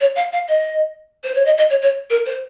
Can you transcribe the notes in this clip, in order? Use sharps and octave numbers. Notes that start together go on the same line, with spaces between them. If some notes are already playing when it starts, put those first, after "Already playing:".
C#5
F5
F5
D#5
C5
C#5
D#5
D#5
C#5
C#5
A#4
C5